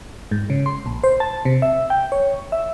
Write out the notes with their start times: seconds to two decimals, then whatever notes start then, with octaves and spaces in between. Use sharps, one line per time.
0.31 G#2
0.50 C#3
0.66 C6
0.86 A#1
1.04 C5
1.20 A5
1.45 C3
1.62 E5
1.90 G5
2.12 C#5
2.52 E5